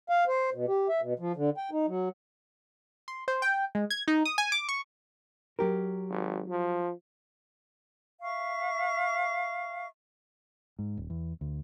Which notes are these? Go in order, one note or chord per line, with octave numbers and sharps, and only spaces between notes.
F5
C5
B2
G4
E5
B2
F3
D3
G5
D#4
F#3
C6
C5
G5
G#3
G#6
D#4
D#6
G#5
D6
C#6
F#3 G4 A#4
G#1
F3
E5 F5 C#6
G#2
D#1
E2
D2